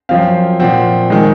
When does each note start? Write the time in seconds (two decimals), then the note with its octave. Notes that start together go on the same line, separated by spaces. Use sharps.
0.09 F#2 F3 C4 F5
0.60 A#2 F3 C4 F#5
1.10 D#3 G#3